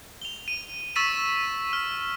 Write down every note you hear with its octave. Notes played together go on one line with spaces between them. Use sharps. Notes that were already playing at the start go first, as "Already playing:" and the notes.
F7 G7
D#7
C#6 E6 A6 B6 D#7 E7
F6